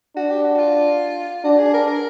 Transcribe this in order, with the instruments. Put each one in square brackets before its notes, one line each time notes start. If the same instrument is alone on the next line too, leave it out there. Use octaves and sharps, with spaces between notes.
[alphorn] D4 [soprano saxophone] F#4
[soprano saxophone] G4
F#4
F#4
F4
[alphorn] D4 [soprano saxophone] F#4
[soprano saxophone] G#4
A#4
A#4